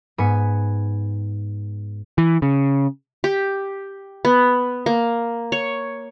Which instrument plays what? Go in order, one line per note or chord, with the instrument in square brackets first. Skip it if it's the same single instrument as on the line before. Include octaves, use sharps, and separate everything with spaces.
[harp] G#2 B3 G#5 B5 C#7
[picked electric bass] E3
C#3
[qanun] G4
B3
A#3
C#5